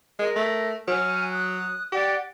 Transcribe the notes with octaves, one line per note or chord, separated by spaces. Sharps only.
G#3 A#4
A3
F#3 G#5 F6
D#6 F#6
G4 D5 F#5 G5